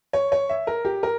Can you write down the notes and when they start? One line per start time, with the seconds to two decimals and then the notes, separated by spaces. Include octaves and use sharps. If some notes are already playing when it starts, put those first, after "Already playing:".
0.13 C#5
0.32 C#5
0.49 E5
0.67 A#4
0.85 G4
1.03 A#4